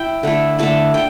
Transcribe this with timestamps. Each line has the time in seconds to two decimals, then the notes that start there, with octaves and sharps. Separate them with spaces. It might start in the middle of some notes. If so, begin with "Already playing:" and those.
Already playing: E4 G5
0.23 D3 A3 E4
0.59 D3 A3 E4 A5
0.94 D3 G5